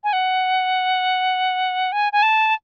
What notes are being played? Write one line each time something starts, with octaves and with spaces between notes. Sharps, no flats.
G#5
F#5
G#5
G#5
A5